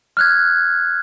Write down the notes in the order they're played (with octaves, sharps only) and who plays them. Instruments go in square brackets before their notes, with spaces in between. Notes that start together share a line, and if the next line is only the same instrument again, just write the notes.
[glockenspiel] F6 F#6 G#6